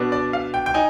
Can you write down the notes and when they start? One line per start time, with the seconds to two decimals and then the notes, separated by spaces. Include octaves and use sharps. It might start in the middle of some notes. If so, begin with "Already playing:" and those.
Already playing: B2 B3 D4
0.12 D5
0.33 F5
0.54 G5
0.66 G5
0.74 D#4 G#5